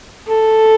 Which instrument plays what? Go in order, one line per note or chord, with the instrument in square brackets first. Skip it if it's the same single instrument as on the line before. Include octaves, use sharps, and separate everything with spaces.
[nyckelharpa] A4